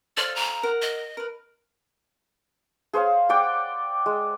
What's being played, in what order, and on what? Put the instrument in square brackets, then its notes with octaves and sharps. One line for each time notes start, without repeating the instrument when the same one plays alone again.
[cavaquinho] A4 C5 F5 [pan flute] D5
[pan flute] A#5
[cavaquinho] A#4 F#5
[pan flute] D#5
[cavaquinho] A#4 B4
[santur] G#4 C5 C#5 F5
D5 F#5 G5 D6
G#3